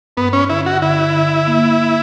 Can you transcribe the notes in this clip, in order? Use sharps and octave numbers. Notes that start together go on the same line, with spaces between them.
G2 B3
C#4
D3 E4
F#4
D3 E4
D3
A#3
A#3